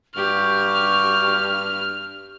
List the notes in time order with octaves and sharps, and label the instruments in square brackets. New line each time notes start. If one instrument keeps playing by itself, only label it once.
[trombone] G2 [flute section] F#4 C#6 [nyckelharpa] G4 [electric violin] F6